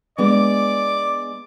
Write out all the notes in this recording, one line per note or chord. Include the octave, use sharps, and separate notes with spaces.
G#3 B3 D4 D5 D6